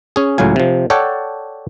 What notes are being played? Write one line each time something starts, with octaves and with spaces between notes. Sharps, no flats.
C#4 G#4
C#2 A2 F#3 F5 G#5
C3 F3
A4 C#5 D5 F#5 G5 A5